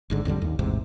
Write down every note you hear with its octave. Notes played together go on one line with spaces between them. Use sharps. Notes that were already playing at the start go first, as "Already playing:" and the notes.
G#1 G#2 D3
A1 F2 D3 G3
D#2
A1 E2 G#2 C3